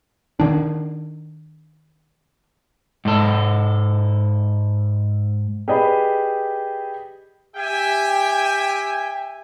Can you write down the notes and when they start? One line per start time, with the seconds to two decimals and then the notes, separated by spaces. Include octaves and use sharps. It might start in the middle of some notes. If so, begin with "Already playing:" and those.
0.40 D#3 D4
3.05 G#2 A4
5.68 G4 G#4 B4 D5 D#5 B5
7.57 G4 E5 G5 G#5